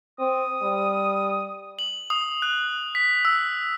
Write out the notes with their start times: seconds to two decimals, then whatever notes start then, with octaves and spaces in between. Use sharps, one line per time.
0.19 C4 D#6
0.62 G3
1.79 F#7
2.10 D#6
2.42 F#6
2.95 B6
3.25 E6